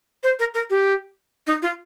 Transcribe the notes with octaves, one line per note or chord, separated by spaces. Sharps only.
C5
A#4
A#4
G4
D#4
F4